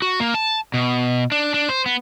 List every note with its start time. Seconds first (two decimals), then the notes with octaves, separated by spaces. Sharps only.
0.02 F#4
0.20 A#3
0.34 A5
0.74 B2
1.32 D4
1.54 D4
1.69 C5
1.86 B3